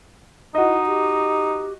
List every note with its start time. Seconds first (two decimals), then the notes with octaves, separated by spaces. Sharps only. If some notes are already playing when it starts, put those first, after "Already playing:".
0.55 D#4 E4 F#4 D#5
0.86 G4